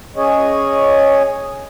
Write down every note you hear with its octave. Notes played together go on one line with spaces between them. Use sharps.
C#4 G#4 C#5 D#5